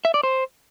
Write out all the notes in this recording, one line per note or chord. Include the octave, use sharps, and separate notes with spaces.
E5
D5
C5